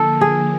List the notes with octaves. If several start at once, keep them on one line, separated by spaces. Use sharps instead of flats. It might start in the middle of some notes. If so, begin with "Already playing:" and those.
Already playing: D3 F3 A#3 A4
G#4